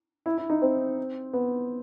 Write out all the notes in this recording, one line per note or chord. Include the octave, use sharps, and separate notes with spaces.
E4
E4
D#4
C4
B3